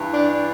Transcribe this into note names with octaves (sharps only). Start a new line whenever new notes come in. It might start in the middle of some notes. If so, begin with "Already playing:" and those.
Already playing: G2 E3
D4